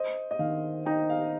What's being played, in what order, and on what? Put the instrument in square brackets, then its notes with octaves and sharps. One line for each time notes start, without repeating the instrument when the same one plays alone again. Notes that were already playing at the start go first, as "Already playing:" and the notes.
Already playing: [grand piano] C5 [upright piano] D#5
[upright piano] D#5
[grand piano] D#3 [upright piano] F5
[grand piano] D#4 [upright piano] G5
[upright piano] F5